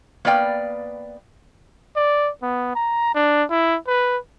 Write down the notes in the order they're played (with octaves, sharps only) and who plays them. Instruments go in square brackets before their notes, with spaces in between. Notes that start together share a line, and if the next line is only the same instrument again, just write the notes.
[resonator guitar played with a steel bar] A#3 B3 B4 D5 F5 G5
[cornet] D5
B3
A#5
D4
E4
B4